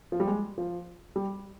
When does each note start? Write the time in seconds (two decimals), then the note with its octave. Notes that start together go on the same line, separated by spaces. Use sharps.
0.12 F3
0.20 G3
0.27 G#3
0.58 F3
1.16 G3